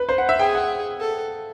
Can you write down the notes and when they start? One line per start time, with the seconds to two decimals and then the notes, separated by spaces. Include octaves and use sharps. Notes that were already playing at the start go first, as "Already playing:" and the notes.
Already playing: B4
0.09 C5
0.18 F#5
0.29 E5
0.39 G#4 G5
0.55 F#5
1.00 A4